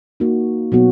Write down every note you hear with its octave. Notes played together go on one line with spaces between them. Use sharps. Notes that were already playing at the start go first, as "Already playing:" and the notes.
A#3 D#4 F#4
B2 F#3 B3 F#4